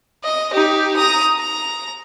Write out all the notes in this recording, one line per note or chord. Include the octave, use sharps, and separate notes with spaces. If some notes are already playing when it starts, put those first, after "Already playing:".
D#5
D#4 G4
A#5 D#6
A#5